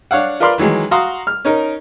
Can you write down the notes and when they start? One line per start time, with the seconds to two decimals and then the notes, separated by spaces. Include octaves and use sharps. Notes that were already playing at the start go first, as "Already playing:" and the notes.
0.11 D4 C#5 F5 F#5
0.40 F4 A#4 B4 D5 C6 F6
0.58 D#3 E3 F#3 G#3
0.91 F#4 F5 A#5 C6 D#6
1.27 F6
1.45 C#4 D#4 A#4